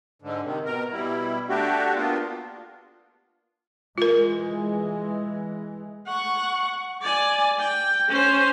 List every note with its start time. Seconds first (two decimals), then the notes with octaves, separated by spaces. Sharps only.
0.22 G#2 D3
0.43 C3 D#3
0.65 B2 A#4
0.92 B2 G3 E4
1.49 A3 D4 F#4 G4
1.95 A#3 B3 D4 F4
3.98 E3 G#3 F4 A#4
6.07 F#5 C#6
7.02 D5 G#5
7.59 G5
8.08 C#4 C5